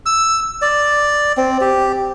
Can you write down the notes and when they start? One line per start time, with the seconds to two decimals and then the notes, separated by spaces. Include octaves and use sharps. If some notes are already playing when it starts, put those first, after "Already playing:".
0.06 E6
0.62 D5
1.37 C4
1.61 G4